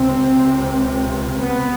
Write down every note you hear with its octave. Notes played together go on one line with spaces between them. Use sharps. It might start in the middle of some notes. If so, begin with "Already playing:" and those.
Already playing: C#2 C3 C4
B3